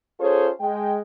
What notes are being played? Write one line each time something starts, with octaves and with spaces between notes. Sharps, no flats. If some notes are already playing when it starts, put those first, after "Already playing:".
C#4 F4 G#4 A4 C5 C#5
G#3 G5